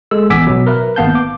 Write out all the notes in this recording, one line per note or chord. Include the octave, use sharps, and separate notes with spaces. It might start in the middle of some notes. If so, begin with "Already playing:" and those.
G#3 A4 E6
A1 B3 G#5 D6 E6 B6
B2 F#3
A#4 B4 E5
G#1 A#3 B3 F5 A5 G6
D6